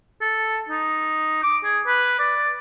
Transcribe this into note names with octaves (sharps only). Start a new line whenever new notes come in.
A4
D#4
D6
G#4
B4
D5